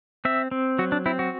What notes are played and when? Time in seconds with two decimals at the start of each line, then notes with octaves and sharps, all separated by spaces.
0.25 C4 E5
0.51 C4
0.79 F#3 F#4
0.92 D4
1.06 C4 E4
1.19 F#4